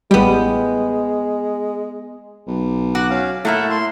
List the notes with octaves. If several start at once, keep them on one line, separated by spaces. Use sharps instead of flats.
A1 G3 G#3 B3 G5
B1
F#4 D6 F#6
C#4 F5
A2 A3 A#3 E5 F#5
C6